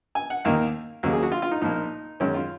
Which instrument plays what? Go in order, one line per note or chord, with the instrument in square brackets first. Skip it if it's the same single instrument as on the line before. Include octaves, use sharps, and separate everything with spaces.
[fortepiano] G#5
F#5
D#2 D#3 A#3 F5
D#2 C#3 F#3 A#3
G#4
F#4
F4
F4
D#4
A#1 A#2 F3 A#3 D#4
F#2 D#3 G#3 C#4
F4